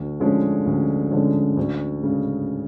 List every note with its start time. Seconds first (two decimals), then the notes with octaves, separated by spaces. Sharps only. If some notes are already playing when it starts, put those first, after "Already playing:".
Already playing: D2
0.20 D3 F3 G#3 C#4
0.66 D2
1.11 D3 F3 G#3 C#4
1.57 D2
2.03 C#3 G#3